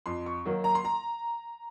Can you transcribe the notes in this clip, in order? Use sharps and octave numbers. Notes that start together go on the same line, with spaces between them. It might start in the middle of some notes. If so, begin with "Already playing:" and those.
F2 C6
C#6
D#3 F#3 A#3
A#5
C6
A#5